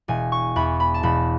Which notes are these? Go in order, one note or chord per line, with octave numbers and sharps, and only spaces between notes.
E1 G#5
C#6
E2 B5
B5
A5
E1 B5